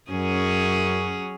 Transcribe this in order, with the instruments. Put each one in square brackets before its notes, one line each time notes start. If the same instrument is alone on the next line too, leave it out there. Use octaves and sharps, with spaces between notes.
[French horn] F#2 [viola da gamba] F#3 C#4 G#4